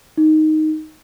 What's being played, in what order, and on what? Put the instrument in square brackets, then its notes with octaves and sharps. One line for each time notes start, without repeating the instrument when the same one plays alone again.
[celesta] D#4